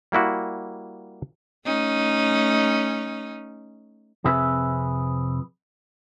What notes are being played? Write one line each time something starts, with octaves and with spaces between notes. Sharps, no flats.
G3 A#3 E4 F#4
A3 C#4 D#4
F2 C3 G#4 B4 E5